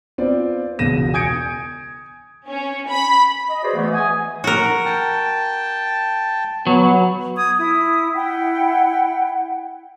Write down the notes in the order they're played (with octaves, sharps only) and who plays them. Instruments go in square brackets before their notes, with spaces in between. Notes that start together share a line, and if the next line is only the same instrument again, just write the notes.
[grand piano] B3 C4 F4 D5
E1 C#2 B2 A#6 D#7 E7
G#5 D#6 G6 G#6 C#7 D7
[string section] C#4
B5
[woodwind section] D#5
F#4 G#4 B4 C5 D5 D#5
E3 A3 B3
G#5 D#6
[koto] F#4 A#4
[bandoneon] G5 A5
[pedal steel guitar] F#3 [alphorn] B3
[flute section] D#6 G#6
E4 D#6
E4 F#5 G5